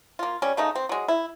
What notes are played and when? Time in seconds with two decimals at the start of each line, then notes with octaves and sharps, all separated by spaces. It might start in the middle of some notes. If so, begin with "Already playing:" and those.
0.19 A#3 F4
0.42 G3 C#4
0.57 C#3 A3 D#4
0.75 C4
0.89 F#3 G#3
1.08 E4